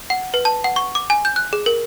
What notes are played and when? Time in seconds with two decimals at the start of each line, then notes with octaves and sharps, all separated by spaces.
0.10 F#5
0.34 B4
0.45 A5
0.64 F#5
0.76 C#6
0.95 D6
1.10 G#5
1.25 G6
1.36 F#6
1.53 G#4
1.66 A#4